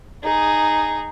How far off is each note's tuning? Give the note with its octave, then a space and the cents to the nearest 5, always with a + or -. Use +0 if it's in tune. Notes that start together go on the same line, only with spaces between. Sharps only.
D#4 -5 G#4 +0